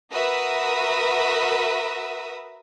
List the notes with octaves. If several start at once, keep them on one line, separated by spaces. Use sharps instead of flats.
F#4 A#4 B4 E5 D#6 A#6